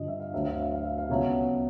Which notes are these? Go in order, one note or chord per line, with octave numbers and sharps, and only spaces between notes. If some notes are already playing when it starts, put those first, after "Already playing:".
Already playing: G2 D3 F3 D#5
E5
F5
D2 D3 F#3 E5
F5
E5
F5
E5
F5
C#2 B2 F#3 E5